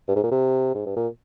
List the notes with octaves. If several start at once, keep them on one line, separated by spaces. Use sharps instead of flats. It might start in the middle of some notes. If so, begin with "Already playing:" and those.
G2
G#2
A#2
C3
G#2
G2
A#2